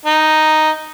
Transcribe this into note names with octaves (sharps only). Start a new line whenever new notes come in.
D#4